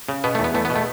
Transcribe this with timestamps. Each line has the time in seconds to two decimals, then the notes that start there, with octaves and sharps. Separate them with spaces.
0.09 C#3
0.24 B2 B3
0.35 E2 A3
0.44 B3
0.54 E2 A3
0.65 B3
0.70 B2
0.76 A3